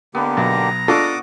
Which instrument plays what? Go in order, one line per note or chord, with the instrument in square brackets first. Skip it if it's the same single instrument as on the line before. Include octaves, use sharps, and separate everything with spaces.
[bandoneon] D3 A#3 G4 [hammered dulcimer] B3
[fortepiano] B1 [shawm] A#5
[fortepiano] D4 F4 A4 [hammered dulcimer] F#4 [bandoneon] D6 D#6